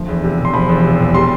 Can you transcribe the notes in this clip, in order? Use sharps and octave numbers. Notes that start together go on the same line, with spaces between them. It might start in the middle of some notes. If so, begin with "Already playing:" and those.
Already playing: D2 F3
E2
C3
E1
C6
F3 B5
E2
C3
E1
G3 C6